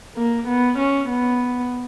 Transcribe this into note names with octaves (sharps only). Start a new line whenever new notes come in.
A#3
B3
C#4
B3